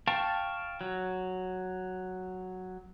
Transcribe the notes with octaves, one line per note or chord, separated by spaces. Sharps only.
F5 G5 A5 C#6
F#3